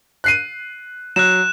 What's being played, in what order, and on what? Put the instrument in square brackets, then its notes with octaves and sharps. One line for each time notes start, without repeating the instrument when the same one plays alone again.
[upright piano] F#6 C7 D#7
[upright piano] F#3 [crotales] F#6 E7